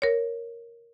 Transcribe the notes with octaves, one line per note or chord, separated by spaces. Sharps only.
A#4 C#5